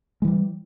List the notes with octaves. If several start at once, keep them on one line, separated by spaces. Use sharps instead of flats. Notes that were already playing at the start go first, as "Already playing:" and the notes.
E3 G3 G#3